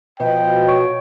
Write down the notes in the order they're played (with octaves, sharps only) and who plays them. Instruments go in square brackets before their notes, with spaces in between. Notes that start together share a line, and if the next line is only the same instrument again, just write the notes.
[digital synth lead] B2 [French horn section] F3 D#5 [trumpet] G5
[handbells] C#5 C#6 D7